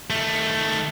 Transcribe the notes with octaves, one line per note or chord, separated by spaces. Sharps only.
D#3 A3